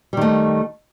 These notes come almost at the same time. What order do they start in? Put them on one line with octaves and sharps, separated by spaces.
G3 D#3 A3